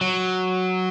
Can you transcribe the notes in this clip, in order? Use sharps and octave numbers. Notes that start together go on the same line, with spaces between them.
F#3